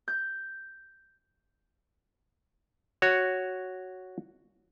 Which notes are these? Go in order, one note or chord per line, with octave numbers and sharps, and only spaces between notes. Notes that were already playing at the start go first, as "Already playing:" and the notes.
G6
F#4 C#5